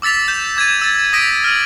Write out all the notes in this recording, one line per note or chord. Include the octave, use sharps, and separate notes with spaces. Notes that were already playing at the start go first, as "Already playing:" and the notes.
D6 E6 A6 B6 F7
G6 E7
D6 G#6 A6 D#7
E6 A6
D#6 A#6 B6 D7 D#7
F6 D#7 F#7